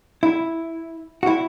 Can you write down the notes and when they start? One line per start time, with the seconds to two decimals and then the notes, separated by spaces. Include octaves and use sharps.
0.23 E4
1.23 F#4
1.27 E4